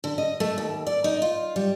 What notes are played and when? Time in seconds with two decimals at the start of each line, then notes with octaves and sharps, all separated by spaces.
0.04 D3
0.18 D#5
0.40 A3
0.58 D#2
0.87 D5
1.04 D#4
1.22 F4
1.56 G3